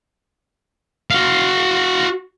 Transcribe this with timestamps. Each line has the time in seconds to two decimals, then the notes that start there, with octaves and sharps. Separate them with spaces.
1.11 F#4 F5